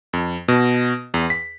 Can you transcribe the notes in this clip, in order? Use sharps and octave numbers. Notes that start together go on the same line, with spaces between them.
F2
B2
E2
B6